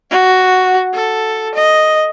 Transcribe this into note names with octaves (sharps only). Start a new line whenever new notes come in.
F#4
A4
D#5